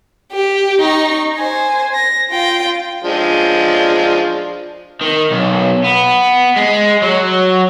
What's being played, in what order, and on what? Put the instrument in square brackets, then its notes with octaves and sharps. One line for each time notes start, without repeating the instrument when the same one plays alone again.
[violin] G4
D#4 C#6
C5 G#5
A#6
F4 G5
[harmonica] F3 G#3 D4
[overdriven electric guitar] D#3
B1
B3
G#3
F#3